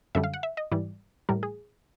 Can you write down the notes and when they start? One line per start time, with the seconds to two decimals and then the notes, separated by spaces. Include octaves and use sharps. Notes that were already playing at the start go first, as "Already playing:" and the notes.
0.15 F#2 D3 G3 E5
0.24 F5
0.34 F#5
0.43 E5
0.57 D#5
0.72 G#2 E3 G3 D5
1.29 A2 E3 G3 A#4
1.43 G#4